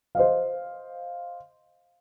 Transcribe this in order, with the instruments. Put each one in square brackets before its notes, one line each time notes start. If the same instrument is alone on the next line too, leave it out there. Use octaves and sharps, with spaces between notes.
[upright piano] C5 D#5 F5